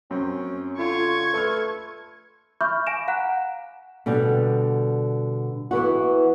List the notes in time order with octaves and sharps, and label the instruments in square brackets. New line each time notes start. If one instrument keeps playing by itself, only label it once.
[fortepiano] F#2 C4 [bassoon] C#4
[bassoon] D3 [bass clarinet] F4 [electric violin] C#6 G#6
[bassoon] A3 [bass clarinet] A4 [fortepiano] B4 C6 F6
[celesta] E5 B5 C#6 D6 F6 G6
F5 G#5 A#6 D7 E7
F5 F#5 A#5 F#6
[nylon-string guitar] B2 D3 G3
E3 B3 F#4